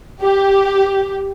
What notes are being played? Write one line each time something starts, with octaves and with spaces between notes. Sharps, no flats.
G4